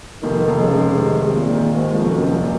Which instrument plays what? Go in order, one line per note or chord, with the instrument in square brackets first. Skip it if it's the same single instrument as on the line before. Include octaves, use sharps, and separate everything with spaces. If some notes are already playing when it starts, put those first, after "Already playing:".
[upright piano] F1 [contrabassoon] D#3
[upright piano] F1
[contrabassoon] C#3
[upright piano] G#3
[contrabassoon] C3 [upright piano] D#3
[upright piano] G#3
[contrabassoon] A#2
[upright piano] D#3
[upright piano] D#2 [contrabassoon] G#2
[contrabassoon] F2
[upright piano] F1
[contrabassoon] F#2
[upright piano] F1
[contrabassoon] A#2